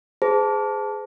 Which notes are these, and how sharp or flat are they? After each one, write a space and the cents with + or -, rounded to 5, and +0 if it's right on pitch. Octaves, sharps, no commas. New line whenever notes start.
G#4 +0 C5 -40 A5 +0